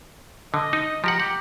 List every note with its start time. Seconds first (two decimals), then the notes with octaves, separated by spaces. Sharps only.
0.54 D3 D#5
0.73 D#4
1.04 F3 G4 F#5 A#5
1.20 G4 F#5